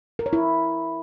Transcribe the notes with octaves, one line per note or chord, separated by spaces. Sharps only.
A#4
C#5
E4